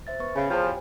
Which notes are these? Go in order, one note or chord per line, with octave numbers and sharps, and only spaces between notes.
C5 E5 A6
B3 B4 C#6
C#3 C#5 G#5 B5
E2 F3 C5 G5
G4 G#5